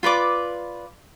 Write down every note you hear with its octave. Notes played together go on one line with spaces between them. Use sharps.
F4 B4 D5 D6